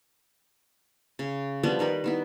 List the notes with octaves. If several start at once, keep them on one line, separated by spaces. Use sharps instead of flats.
C#3
F3 G3 B3 D4
D#3 G3 A#4 B4
D#3 B3 E4